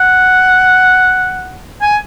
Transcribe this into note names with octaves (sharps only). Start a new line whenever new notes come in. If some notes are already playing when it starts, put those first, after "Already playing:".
Already playing: F#5
G#5